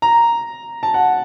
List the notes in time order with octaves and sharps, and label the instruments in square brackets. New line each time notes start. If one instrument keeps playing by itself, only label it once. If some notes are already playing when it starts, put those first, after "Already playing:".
[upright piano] A#5
A5
F#5